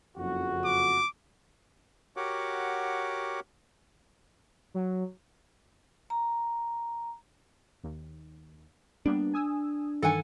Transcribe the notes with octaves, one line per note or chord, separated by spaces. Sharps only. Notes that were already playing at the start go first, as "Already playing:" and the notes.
F#1 F2 F#4
D6
F#4 G4 A#4 C#5 F#5 D6
F#3
A#5
D#2
G3 A#3 B3 D4
G#5 D#6 E6
G2 D#3 E3 A4 F#5 G#5